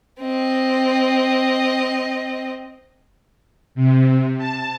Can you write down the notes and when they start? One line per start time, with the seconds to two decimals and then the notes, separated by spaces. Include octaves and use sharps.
0.21 C4 D#5
3.75 C3
4.37 A5